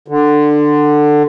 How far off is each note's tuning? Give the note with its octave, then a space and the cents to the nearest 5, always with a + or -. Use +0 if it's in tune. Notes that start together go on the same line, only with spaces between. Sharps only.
D3 +15